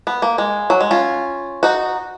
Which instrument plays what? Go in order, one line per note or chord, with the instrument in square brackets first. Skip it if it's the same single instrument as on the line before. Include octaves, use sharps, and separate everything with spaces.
[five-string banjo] B3
A#3
G#3
F#3
G#3
C#4 F4
D#4 F#4